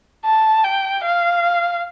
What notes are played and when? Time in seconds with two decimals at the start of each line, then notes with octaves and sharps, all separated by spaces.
0.25 A5
0.64 G5
1.05 F5